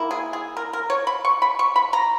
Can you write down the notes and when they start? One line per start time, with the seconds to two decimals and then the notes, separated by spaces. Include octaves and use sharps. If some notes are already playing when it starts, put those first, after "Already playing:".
Already playing: D#3 A#3 E4
0.11 G#4
0.33 G#4
0.57 A#4
0.73 A#4
0.90 C#5
1.07 B5
1.25 C#6
1.42 B5
1.59 C#6
1.76 B5
1.93 A#5